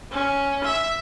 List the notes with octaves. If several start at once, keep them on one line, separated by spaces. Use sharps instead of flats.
C#4
E5